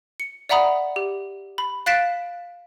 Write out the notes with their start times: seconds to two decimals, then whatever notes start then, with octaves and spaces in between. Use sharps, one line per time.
0.20 C#7
0.49 D5 E5 F#5 A#5 B5 D#6
0.96 G4
1.58 B5
1.86 F5 F#6 A6 B6 D7 E7